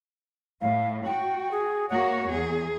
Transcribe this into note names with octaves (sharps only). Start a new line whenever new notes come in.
A2 F5
F#4 G5
G#4
A#3 F#4 C#5 F#5
E2 G#4